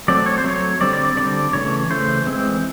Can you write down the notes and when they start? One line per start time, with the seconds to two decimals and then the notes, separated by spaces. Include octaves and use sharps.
0.08 F#3 A3 C4 D5
0.26 C#5
0.38 C5
0.44 F#3 A3 C4 C#5
0.81 D3 G3 C4 D5
0.93 D5
1.05 D5
1.17 D3 G3 C4 D5
1.53 C#3 E3 A3 C#5
1.90 C#3 E3 A3 C5
2.27 E3 G#3 C4